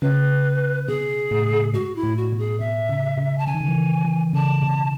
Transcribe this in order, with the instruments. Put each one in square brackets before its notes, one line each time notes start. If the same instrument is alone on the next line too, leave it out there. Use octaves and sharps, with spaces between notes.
[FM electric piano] C#3 [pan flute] B4
[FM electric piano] B2 [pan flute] G#4
[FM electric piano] A2
[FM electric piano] G#2 [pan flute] F#4
[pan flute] E4
[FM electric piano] A2
[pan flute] F#4
[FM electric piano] B2
[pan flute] G#4
[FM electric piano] B2 [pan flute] E5
[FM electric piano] C#3
C#3
[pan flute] A5
[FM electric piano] C#3 [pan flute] G#5
[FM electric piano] D#3
C#3
E3
D#3
E3
[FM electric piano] C#3 [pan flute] A5
[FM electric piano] B2